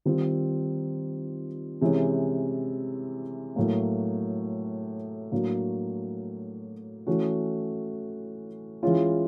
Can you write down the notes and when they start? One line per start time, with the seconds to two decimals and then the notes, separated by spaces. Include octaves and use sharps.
0.05 D#3 G3 C4 F4
1.81 C3 E3 G#3 C#4
3.56 A2 F#3 A#3
5.32 A2 F#3 A#3 D4 F#4
7.07 E3 A3 C#4 F#4
8.83 E3 G#3 C#4 F4